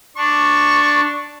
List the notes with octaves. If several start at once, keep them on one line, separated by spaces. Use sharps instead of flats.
D4 C#6